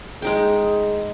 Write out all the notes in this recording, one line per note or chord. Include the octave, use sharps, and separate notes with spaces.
G#3 D#4 G#4 G5